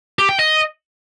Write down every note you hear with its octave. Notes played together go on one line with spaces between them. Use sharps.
G4
G5
D#5